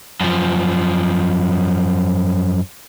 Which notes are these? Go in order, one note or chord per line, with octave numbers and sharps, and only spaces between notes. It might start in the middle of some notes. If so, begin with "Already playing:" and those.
F#2 F3